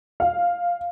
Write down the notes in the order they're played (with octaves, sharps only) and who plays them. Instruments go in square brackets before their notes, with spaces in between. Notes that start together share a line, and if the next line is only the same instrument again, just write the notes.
[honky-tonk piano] F5